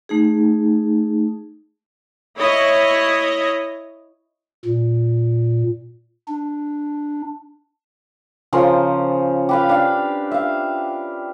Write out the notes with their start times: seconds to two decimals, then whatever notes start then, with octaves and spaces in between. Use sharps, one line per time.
0.09 A3 D#4 G#4
2.38 E4 C#5 D#5
4.65 A#2
6.28 D4
8.53 C#3 F3 A#4 C5
9.49 G4 B4 F5
9.69 D4 F5
10.31 E5 F5